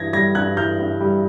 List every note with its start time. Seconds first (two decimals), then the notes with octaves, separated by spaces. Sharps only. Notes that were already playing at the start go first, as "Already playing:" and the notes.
Already playing: G2 E3 G#6 A#6
0.13 G3 G#6 A#6
0.35 G2 F#6 G#6
0.57 E3 F6 G6
0.79 G2
1.01 G3